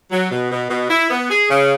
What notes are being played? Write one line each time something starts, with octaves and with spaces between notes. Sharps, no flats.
F#3
B2
B2
B2
E4
B3
G#4
C#3